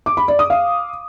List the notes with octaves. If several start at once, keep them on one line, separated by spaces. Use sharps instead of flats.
D6
B5
D5
D#6
F5